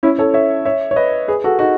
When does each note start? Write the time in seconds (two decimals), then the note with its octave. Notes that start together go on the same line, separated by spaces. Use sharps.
0.03 C#4 E4
0.19 A4 C#5
0.34 C#5 E5
0.65 C#5 E5
0.91 C#5
0.96 B4 D#5
1.28 G#4 B4
1.44 F#4 A4
1.59 D#4 F#4